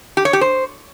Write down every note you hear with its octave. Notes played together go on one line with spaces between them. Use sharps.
G4
C#5
G4
C5